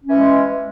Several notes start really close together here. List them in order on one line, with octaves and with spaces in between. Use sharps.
C#4 E3 G#3